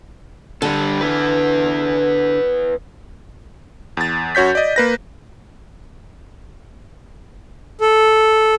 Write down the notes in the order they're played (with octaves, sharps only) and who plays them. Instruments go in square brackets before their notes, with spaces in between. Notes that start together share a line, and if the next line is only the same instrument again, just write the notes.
[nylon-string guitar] D3 [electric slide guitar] G3 A4
[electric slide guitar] B3 E4 B4
[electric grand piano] E2 A6
F#2 F#4 C#5 G6 B6
D5 D#5
A#3 B4 A#6
[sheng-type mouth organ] A4